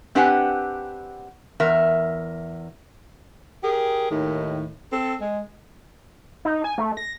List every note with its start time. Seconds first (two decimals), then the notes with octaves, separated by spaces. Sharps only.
0.15 C4 D4 G4 B4 F#5 G#5
1.60 E2 A#4 E5
3.63 G4 G#4 A#4
4.10 D#2 A2 D#3
4.92 C4 A4
5.21 G#3
6.45 D#4
6.64 G#5
6.78 A3
6.97 A#6